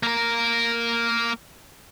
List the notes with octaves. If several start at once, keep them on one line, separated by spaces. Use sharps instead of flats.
A#3 A#4